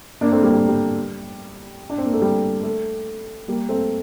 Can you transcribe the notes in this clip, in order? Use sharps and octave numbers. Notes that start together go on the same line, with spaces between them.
A#3 D4
A3 C4
G3 A#3
G3
G3
D4
C4
A#3
A3
G3
A3
G3 A#3
A3 C4